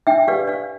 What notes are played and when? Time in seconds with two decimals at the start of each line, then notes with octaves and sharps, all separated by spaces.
0.07 D4 E5 G5
0.28 G4 B4 D5 F5
0.48 D4 D5 F5